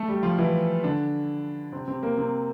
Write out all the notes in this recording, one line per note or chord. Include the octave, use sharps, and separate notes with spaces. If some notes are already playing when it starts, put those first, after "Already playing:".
Already playing: A3 A4
G3 G4
F3 F4
E3 E4
D3 D4
C3 C4
C3 C4
A#3
C3 C4